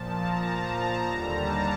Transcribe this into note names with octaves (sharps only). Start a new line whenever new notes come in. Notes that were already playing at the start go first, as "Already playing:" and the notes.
Already playing: A#2 F3 A5
A#5
A5
A#5
D#2 D3 G3 A#5
A5